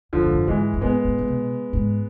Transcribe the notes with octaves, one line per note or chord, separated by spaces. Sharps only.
F2 D3 F3
G#2
F2
G#2 E3 G#3
G#2
A2 G#3 B3
A2
A2
B2
G#2